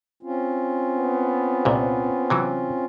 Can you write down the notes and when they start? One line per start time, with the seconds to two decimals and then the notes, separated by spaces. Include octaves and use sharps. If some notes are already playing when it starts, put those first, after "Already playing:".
0.23 C4 C#4 F4
0.97 B3
1.65 C2 A#2
2.30 C3 E3 F#3